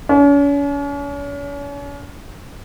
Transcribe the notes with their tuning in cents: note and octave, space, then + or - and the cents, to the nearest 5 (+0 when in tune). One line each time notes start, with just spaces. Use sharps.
C#4 +40